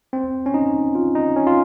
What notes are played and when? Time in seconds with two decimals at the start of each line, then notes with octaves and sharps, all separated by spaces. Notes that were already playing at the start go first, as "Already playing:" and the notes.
0.13 C4
0.46 C#4
0.54 D#4
0.95 F4
1.15 D#4
1.36 C#4
1.47 F4